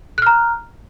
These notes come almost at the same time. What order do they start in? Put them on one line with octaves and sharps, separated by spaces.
F#6 F6 A#5